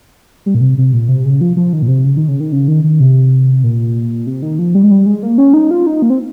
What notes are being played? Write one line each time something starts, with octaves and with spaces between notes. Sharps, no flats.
G3
A#2
C3
C3
A#2
C3
C#3
F3
F3
D#3
A#2
C3
C#3
D#3
C#3
D#3
C#3
D#3
D#3
C3
A#2
C3
D#3
F3
G3
G#3
G3
G#3
A#3
C#4
D#4
F4
D#4
A#3
C4